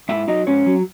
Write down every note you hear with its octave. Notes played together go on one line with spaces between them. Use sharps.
G#2 E4 E5
F#3 D#4 D#5
G#2 C#4 C#5
F#3